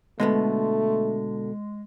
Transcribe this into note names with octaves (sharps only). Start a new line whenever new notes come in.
B2 D3 G#3 A3 B3